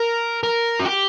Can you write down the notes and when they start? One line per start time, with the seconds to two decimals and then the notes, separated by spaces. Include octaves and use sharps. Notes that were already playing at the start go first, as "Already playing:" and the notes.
Already playing: A#4
0.43 A#4
0.79 F#4
0.86 G4